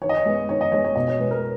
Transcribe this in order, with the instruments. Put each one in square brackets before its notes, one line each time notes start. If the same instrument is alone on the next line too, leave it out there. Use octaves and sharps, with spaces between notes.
[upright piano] D#3 C#5
D#5
C#5
G#3 B3
D#3 C#5
D#5
G#3 B3 C#5
C#5
B2 D#5
C#5
G#3 B3 B4
A#4